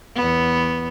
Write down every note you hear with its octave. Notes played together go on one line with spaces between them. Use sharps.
E2 B3